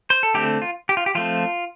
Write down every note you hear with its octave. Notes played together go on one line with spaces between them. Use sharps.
C5
A4
D3 A3 C4 G4
F4
G4
F4
G4
F3 A3 C4 F4